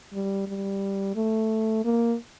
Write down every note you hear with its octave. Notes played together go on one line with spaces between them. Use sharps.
G3
G3
A3
A#3